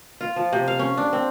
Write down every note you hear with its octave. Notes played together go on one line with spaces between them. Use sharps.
F4
F3
C3
F5
C#4
D4
C4